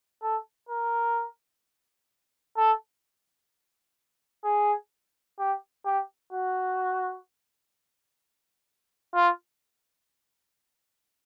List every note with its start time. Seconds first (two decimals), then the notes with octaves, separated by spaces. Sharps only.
0.22 A4
0.69 A#4
2.57 A4
4.45 G#4
5.39 G4
5.85 G4
6.33 F#4
9.15 F4